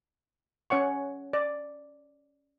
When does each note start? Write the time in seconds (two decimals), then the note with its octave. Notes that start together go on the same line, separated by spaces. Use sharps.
0.70 C#4 C#5 F#5 C#6
1.33 D5